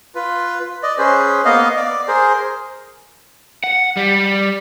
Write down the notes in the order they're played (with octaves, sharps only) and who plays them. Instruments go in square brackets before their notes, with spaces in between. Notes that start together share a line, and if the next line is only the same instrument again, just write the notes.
[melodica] F4 B4
D5 D#5
C#4 G#4 B4 C5
A#3 B3 D#5 F5
D5 D6
G#4 A#4 C5
[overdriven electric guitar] F#5
G3